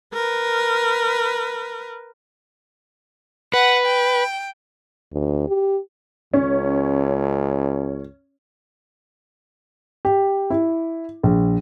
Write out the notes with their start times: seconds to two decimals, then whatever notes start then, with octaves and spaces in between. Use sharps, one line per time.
0.13 A#4 B4
3.54 B4 F#5
3.86 G5
5.12 D2
5.48 G4
6.34 C#2 C#4
10.05 G4
10.50 E4
11.23 A#1